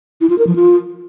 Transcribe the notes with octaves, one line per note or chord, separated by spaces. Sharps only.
E4
F4
A#4
F3
F4